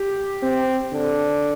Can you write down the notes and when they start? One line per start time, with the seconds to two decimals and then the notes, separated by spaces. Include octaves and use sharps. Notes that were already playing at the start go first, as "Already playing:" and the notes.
Already playing: G4
0.43 C4
0.93 D3